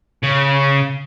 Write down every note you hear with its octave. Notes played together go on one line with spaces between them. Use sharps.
C#3